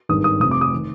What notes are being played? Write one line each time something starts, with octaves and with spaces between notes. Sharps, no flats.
G#1 G2 D#3 G#3 D#6
D#6
F1 F2 C3 D#6
D6
D#6
D#3